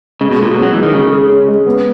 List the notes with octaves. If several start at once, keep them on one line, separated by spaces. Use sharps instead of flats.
C#3 G#3
B2
A#2 G#4
B2
C#4
F#3
E3 G#3
D#3
C#3 G#3
G#4
C#4
G#3
B3